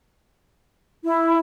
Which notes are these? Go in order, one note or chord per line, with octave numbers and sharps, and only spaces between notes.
E4